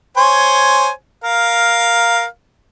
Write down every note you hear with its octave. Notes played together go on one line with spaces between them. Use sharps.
C5 C#5 G#5
A#4 F5